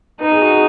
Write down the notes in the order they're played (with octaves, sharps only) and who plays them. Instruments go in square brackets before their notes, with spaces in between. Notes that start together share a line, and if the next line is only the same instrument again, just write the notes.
[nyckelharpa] D#4 [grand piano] B4
[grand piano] G#4
F#4
G#4